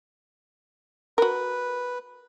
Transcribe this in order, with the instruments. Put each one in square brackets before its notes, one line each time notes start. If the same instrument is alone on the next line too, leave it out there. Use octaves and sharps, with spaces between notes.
[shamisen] F#4 A#4 [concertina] B4